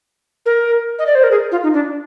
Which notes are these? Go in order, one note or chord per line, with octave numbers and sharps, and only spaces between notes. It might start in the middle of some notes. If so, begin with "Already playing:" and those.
A#4
D#5
D5
C5
A#4
G#4
F4
D#4
D4